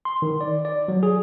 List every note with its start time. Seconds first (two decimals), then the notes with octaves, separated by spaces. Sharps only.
0.05 C6
0.22 D#3
0.41 D5
0.65 D5
0.88 F#3
1.03 G#4